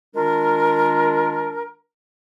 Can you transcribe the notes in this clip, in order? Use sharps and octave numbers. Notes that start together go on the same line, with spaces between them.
D#3 G#3 D4 F4 A#4